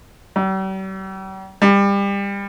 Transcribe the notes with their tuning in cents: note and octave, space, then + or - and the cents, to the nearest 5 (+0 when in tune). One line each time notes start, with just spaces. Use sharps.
G3 -45
G3 +25